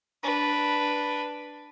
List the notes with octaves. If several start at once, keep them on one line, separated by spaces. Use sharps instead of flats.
D4 B4